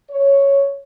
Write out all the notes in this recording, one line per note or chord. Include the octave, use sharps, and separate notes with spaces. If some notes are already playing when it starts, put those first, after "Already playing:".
C#5